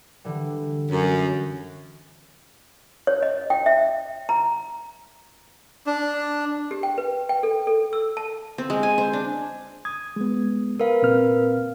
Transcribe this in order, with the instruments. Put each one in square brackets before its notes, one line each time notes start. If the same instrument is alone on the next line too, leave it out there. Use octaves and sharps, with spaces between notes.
[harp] D3 E3 G3
[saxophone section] F#2
[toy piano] C#5
D#5
G5
E5
A#5
[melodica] D4
[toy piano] G4
G5
B4
G5
A4
A4
E6
A5
[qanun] C4
G#3
G#5
C5
D4
[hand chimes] D#6 [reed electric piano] G#6
[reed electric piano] G#3 B3
[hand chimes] A#4 B4 F5
[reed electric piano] A#2 C4 F6